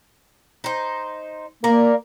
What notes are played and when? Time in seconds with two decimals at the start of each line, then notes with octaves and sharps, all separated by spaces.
0.64 D#4 C5
1.64 A#3 A#4 D5